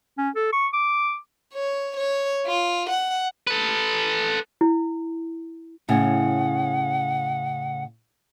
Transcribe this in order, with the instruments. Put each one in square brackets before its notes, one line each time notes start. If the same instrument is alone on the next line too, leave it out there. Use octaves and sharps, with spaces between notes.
[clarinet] C#4
A4
C#6
D6
[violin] C#5
C#5
F4
F#5
[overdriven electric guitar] A4 B4
[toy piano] E4
[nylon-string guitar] A2 C#3 [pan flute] F#5